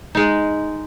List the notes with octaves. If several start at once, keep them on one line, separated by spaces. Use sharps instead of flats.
G#3 D#4